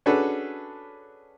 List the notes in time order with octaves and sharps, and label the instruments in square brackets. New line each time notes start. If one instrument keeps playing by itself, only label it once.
[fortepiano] C#4 D4 F#4 G#4 A4 B4